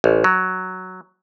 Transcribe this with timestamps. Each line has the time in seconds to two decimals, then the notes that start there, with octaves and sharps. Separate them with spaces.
0.04 A1
0.24 F#3